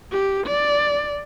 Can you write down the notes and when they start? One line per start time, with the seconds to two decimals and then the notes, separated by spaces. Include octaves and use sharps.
0.12 G4
0.47 D5